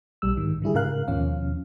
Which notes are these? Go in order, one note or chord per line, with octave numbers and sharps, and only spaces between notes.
B1 G3 E6
G#2 D#3
D3 G3 E4 G#4
G#2 C#3 A#4 F5 F#6
D#2 B2 F3 C#4 F5